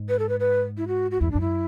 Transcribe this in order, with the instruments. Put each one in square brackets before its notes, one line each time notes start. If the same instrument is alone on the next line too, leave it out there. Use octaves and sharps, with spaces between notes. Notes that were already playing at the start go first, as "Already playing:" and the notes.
Already playing: [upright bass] G#2
[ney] B4
A4
B4
B4
E4
F#4
F#4
[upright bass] E2 [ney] E4
[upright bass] F#2 [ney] D4
[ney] E4